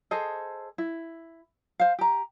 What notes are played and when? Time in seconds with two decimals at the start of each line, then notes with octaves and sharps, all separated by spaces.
0.11 G#4 A4 C5 D#5
0.78 E4
1.80 C5 F5
1.99 G4 A#5